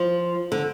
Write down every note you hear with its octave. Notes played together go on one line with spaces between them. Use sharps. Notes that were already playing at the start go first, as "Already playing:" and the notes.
Already playing: F3
D3